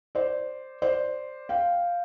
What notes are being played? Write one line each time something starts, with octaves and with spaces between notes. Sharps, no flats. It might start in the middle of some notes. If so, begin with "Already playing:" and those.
C5 D5
C5 D5
F5 G5